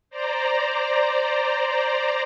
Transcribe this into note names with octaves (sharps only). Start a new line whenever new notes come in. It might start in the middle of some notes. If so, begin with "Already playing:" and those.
C5 D5 A#5